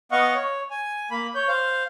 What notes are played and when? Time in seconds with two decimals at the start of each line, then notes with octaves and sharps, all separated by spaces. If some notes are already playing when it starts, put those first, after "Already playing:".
0.12 B3 D#5 F5 F#5 C#6
0.34 C#5
0.71 G#5
1.11 A#3 B5
1.35 C#5 G6
1.48 C5 F5